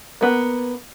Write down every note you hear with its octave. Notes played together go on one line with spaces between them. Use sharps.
A#3 B3